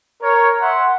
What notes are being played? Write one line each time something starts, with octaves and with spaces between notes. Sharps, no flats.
A#4 C#5
E5 F#5 C6